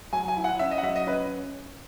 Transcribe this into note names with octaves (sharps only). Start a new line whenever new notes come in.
F#3 G#5
G#5
E4
F#5
C#4 E5
D#5
F#5
F#3 E5
D#5
C#4 B4